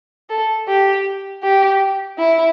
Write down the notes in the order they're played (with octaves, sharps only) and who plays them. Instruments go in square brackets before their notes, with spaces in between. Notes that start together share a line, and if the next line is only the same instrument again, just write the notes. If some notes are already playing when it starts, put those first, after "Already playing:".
[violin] A4
G4
G4
E4